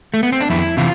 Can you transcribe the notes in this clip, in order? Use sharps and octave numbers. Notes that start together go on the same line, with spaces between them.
A3
B3
C4
D4
F2 E4
C3 E3 F4